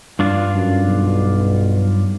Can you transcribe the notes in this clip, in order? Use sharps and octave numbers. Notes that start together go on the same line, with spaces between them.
G2 D4 F4
F#2
B1